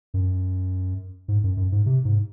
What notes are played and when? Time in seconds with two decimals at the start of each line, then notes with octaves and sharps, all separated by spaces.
0.14 F#2
1.28 G#2
1.44 F#2
1.57 F#2
1.72 G#2
1.86 C3
2.05 G#2